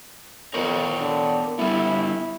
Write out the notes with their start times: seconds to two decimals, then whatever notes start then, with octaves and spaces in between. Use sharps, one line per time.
0.54 F2 B3 A#4 C#5
1.00 D3
1.59 G3 B3 E4